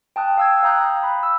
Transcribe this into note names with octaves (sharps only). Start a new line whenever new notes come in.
G5 A5 D#6 F#6
F5 E6 G#6
F5 G5 A#5 D#6 F#6 G6
A#5
B5
E6